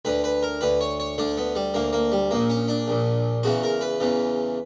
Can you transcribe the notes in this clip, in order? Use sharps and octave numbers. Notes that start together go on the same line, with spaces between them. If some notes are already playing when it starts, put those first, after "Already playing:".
D2 D3 B4
B4
A#4
D2 D3 B4
C#5
C#5
D2 D3 D4
B3
G3
D2 D3 A#3
A#3
G3
A#1 A#2 A#3
C#4
D4
A#1 A#2
E2 C#3 E3 F#4
A#4
B4
E2 C#3 E3